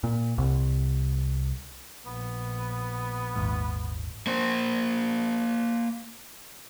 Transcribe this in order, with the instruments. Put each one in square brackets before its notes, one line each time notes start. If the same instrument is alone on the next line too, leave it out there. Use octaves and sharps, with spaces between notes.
[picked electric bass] A#2
C2
[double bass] A#1 [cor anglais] B3
[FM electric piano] G#1 D#2 G#2
[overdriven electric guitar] A#3 C5